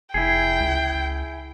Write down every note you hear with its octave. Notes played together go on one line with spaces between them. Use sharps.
F1 E4 G#4 G5
C#2